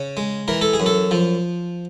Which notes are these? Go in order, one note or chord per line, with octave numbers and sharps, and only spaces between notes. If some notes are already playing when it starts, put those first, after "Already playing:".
Already playing: C#3
G#3
E3 A#4
A4
G#4
F#2
A4
F3